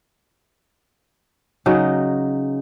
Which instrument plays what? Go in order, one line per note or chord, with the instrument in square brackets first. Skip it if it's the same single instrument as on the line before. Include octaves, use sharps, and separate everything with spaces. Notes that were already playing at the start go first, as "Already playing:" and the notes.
[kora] C#3 F#3 D#4